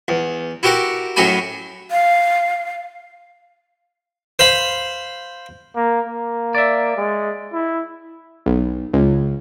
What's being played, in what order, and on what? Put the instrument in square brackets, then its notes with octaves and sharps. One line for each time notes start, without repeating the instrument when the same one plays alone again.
[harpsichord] E2
E4 F#4 G4 A#4 F#5
F#2 A2 F#3 F#4 G#5 B5
[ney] F5
[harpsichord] C5 F5 B5
[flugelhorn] A#3
A#3
[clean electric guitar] D5 E5
[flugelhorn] G#3
E4
[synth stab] B1
C#2